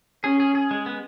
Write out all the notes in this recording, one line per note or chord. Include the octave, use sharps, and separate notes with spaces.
C#4 G#4
G#4
G#4
G#3
B3